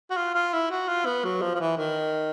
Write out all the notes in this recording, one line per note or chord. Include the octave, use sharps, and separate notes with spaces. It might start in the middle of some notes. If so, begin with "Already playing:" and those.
F#4
F4
F4
E4
F#4
F4
B3
F#3
F3
F3
E3
D#3